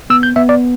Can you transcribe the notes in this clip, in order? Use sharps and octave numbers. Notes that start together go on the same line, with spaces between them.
B3 E6
G6
B3 E5
D5